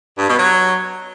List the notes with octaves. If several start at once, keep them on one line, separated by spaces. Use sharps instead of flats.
G2
B2
F#3